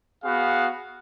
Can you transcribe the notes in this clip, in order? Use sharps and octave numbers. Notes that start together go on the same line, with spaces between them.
B3 F#4 G#4 F5